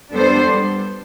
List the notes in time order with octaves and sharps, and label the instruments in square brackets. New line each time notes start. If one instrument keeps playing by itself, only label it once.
[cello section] G3 B3 D4 A4 C5